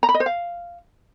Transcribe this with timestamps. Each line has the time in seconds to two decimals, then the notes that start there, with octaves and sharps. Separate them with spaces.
0.03 A#5
0.09 B5
0.14 D#5
0.20 C5
0.26 F5